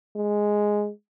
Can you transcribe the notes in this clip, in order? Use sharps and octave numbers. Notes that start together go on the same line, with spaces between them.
G#3